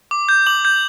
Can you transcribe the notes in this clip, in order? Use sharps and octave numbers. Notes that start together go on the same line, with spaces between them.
D6
G6
D6 F#7
G6